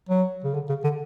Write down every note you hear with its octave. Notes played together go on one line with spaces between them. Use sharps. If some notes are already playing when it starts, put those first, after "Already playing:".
F#3
C#3
D3
C#3
D3